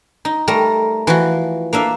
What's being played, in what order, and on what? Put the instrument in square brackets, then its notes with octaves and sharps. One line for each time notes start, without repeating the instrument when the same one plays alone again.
[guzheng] D#4
G3 A3 A#4
E3 F3 F#4
A#3 D4 E5 F5